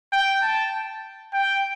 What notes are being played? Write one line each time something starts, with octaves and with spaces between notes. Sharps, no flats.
G5
A5
G5